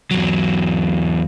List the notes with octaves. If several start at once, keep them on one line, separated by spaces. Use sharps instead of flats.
E2 F#3